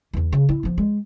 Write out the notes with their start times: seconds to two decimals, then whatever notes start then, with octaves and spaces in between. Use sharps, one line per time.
0.13 E2 E3
0.33 C#3
0.49 E4
0.63 F3 B3
0.78 G#3